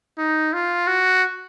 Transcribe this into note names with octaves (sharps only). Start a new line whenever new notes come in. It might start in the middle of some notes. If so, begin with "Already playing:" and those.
D#4
F4
F#4